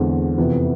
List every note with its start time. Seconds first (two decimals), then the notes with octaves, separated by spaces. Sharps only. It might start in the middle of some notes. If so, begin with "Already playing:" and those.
Already playing: E2 D3 G#3 C4
0.37 F2 C3 E3 B3